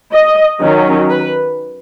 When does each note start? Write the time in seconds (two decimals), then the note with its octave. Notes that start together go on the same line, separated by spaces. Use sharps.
0.13 D#5
0.61 D#3 F#3 C#4
1.09 B4